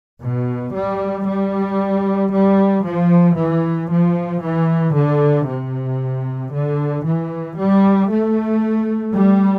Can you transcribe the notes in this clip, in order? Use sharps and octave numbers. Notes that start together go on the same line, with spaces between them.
B2
G3
G3
G3
F3
E3
F3
E3
D3
C3
D3
E3
G3
A3
G3